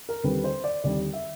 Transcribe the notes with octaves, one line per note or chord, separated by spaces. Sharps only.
A#4
D#2 D3 G3 C4 B4
C5
D5
D#2 D3 G3 C4 D5
E5